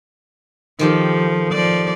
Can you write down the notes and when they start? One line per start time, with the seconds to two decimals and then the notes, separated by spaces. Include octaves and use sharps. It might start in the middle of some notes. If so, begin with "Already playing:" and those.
0.79 D#3 F3 G4 A4
1.53 F3 D5